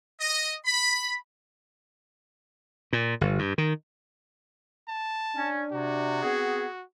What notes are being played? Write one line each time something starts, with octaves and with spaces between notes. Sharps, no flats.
D#5
B5
A#2
G1
G2
D#3
A5
C#4 D4
C3 F#4
B3 C4 G#4